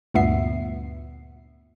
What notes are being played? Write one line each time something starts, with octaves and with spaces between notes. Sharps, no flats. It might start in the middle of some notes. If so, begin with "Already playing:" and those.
D2 G2 A#2 B3 E5 C7